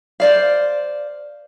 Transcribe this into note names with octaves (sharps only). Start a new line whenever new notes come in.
C5 D5 F5